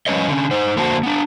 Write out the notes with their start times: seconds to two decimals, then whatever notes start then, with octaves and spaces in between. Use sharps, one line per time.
0.07 F3 G3 C#4 B4 C#5 D#5
0.28 D3 C#4
0.51 D#4 C5
0.76 F2 D3 A#3 F#4 C5 A5
1.03 B3 D4